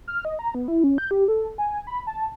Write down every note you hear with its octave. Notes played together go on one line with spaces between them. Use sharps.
F6
D#5
A#5
B3
E4
C#4
G6
G4
A4
G#5
B5
A5